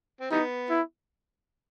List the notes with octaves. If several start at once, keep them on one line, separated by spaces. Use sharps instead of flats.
C4
E3 G3 B3 D#4
E4